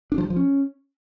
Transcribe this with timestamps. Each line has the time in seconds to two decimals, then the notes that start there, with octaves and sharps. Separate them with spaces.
0.12 D4
0.18 F3
0.24 G3
0.30 F3
0.36 C#4